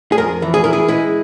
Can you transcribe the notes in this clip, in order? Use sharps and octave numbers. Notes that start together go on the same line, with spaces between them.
G#4
F2 A#4
E3
G#4
E4 A#4
G#4
G#3 E4